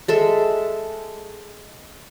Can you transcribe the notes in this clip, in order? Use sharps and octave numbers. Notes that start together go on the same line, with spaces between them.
G#3 A4 E5